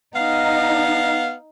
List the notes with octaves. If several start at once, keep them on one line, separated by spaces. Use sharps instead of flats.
B3 D#4 F5